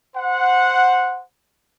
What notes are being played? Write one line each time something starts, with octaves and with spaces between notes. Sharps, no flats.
C5 F#5